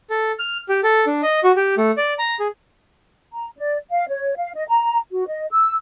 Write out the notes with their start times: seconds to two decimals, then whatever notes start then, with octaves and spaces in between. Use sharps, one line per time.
0.10 A4
0.39 F6
0.69 G4
0.84 A4
1.07 D4
1.23 D#5
1.44 F#4
1.56 G4
1.78 A3
1.97 D5
2.19 A#5
2.40 G#4
3.32 A#5
3.58 D5
3.90 F5
4.08 C#5
4.37 F5
4.55 D#5
4.68 A#5
5.11 F#4
5.28 D#5
5.51 E6